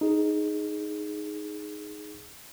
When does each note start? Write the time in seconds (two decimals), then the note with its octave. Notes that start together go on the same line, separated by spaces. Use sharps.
0.01 D#4 G#4